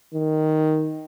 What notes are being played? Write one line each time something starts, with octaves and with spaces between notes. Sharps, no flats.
D#3